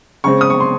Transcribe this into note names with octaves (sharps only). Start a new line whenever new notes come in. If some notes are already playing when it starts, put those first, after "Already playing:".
C#3 G#3 C4 C#6
D#6
C#6
C6